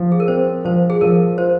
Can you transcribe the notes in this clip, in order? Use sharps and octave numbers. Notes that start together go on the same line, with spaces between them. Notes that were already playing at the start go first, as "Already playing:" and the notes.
Already playing: F3
G#4
A#4
C4 C5
F3 C5
G#4
F3 A#4
F4 C5